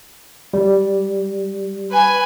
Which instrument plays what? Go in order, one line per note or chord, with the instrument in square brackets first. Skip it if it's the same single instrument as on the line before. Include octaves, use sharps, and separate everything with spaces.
[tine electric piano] G3
[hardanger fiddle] B4 G#5